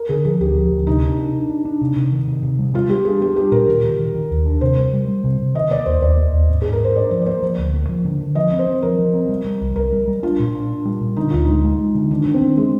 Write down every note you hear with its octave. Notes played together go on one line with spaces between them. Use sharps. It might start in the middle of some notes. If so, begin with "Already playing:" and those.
Already playing: A#4
D3 G#4
F3 G#4
D2 G4
F3
D2
C3 D#4
D4
D4
D4
D4
D4
C3
C3
D#3
C3
C3
G3
G3 F4
G3 G4
D4 G#4
G3 G4
D4 G4
A#2 A#4
D#3
D#3
D#3
D#3
D#2
D4
C3 C5
G3
G3
G3
C3
C3
D#3 D#5
A#3 D5
D#2 C5
D#2 D5
A#3
D#2
G#2
G#2 G#4
A#4
A#3 C5
D4 D5
F3 C5
D5
A#3 C5
F3
D2
A#3
F3
D3
D3
F3 D#5
C4
C5
C4
F3 A#4
F3
C4
G3
G3
C2
C2 A#4
G3
G3
D4 F4
A#2
D4
D4
G3
A#2
D3 D#4
D2 F4
G#3 D#4
G#3
G#3
D3
D#3 D4
D#3
C4
D#3
G#3